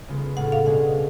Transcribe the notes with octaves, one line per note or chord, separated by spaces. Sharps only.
C#3 G#3 B3 F4
A2 G#3 C#4 F4 F#5
F5
B2 G#3 D4 G#4 F#5